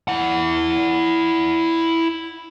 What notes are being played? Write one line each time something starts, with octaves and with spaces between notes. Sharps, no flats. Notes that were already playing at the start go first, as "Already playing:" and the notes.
E4 F#5